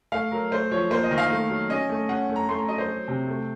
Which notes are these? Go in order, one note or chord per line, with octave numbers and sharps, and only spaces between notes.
A3 F5
F#3 A#4
A3 C5
F3 C#5
A#3 C5
D#5
D#3
F5
A3
F#3
C#4 D#5
A3
C#4 F#5
A3
A#5
A3 C6
A#5
F#3 D#5
C5
F#3
C3
A3